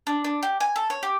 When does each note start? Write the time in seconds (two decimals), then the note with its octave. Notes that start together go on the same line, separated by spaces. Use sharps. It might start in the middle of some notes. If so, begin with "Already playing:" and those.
0.07 D4
0.24 D4
0.43 G4
0.61 G#5
0.76 A4
0.90 C#5
1.03 G4